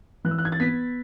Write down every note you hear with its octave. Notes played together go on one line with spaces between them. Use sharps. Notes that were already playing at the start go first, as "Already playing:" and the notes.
E3 F#6
E6
F#6
G#6
A6
B3 B6